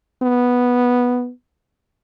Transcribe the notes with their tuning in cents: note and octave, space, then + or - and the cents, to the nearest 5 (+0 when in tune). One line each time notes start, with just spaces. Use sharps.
B3 -5